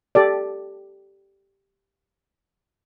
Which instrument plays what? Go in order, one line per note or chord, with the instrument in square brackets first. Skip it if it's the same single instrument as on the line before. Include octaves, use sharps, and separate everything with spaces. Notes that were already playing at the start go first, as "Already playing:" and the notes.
[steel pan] G4 A4 D5